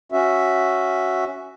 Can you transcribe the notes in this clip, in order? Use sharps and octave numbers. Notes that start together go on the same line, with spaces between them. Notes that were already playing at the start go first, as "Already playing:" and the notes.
C#4 F#4 E5